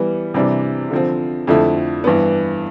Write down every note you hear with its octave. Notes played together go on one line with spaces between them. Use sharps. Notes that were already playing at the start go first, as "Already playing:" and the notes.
Already playing: E3 G3 B3
C3 E3 G3 D4
D3 F3 C4
F2 D3 F3 A3 E4
G2 E3 B3